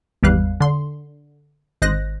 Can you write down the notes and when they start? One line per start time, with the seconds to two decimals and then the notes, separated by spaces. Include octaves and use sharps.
0.23 G#1 E2 G3 B4 F5 F#6
0.60 D3 C6
1.82 G#1 C5 D#5 F#6 A#6